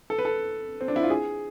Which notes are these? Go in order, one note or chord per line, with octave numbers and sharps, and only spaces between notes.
A4
B4
A4
C4
D4
E4
F4
G#4